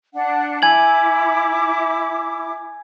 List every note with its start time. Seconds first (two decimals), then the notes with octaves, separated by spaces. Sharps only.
0.14 D4 F#5
0.62 E4 G#5 D6 G#6 F#7